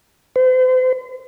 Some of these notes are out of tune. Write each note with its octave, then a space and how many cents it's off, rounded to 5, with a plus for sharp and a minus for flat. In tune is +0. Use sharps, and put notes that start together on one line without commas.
C5 -40